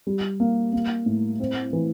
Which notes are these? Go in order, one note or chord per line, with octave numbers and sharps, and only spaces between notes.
G3
A#3
A#3
A2
C4
E3